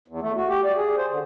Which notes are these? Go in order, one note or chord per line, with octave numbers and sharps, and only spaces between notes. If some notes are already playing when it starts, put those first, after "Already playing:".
E2
A3
F#4
G4
D5
G#4
C5
D3